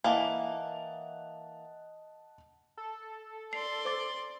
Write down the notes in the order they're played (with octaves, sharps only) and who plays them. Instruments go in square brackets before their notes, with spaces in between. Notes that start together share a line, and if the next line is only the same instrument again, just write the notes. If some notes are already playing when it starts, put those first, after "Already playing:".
[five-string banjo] E3 A#3 [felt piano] D#5 F#5 A5
[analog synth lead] A4
[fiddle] D5 C6 [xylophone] C7
[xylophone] C5 D6 A6